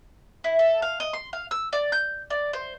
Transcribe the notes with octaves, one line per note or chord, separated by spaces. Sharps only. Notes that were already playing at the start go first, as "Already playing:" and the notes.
E4
A4
F5
D#5
C6
F5
E6
D5
G6
D5
C5